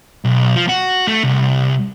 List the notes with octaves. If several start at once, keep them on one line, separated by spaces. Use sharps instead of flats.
B1
F3
F#4
A3
C2